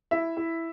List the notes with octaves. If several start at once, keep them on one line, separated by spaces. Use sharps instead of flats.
E4 E5
E4